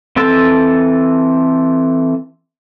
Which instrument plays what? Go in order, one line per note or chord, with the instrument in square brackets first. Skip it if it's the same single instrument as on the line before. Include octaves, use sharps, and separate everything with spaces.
[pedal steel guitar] E3 C4 A4 A5 E6